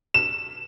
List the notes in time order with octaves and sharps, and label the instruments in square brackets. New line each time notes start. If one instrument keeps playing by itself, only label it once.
[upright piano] E7